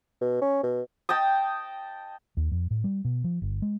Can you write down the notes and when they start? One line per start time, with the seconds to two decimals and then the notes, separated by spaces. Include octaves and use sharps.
0.21 B2
0.42 C#4
0.63 B2
1.09 D#5 G5 A5 D#6
2.37 D#2
2.51 F2
2.71 A2
2.84 G3
3.05 B2
3.24 F3
3.42 G1
3.62 G#3